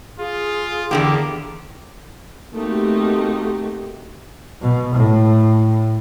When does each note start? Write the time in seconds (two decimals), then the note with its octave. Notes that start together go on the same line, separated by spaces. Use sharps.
0.19 F4 G#4
0.91 E2 D3 A#3 G4
2.53 A3 A#3 C4 D#4 F#4 G4
4.62 B2
4.96 A2